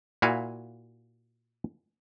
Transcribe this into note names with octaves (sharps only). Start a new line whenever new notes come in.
A#2 E4 F#4 F5 G#5